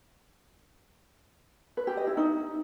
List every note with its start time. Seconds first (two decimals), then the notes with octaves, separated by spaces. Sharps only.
1.77 B4
1.87 G4
1.97 D#5
2.07 E4
2.17 D#4